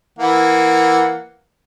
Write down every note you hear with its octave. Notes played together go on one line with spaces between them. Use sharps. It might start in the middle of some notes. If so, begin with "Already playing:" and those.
E3 A#3 F#5